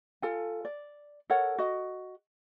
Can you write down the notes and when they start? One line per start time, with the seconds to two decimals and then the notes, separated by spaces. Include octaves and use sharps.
0.22 F4 A4 G#5
0.65 D5
1.30 A4 A#4 C#5 F#5
1.58 F#4 D#5